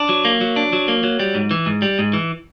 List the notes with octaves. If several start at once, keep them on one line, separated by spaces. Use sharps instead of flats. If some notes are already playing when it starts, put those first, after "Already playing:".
Already playing: D4
F#3
A#3
F#3
D4
F#3
A#3
F#3
G3
G#2
E3
G#2
G3
G#2
E3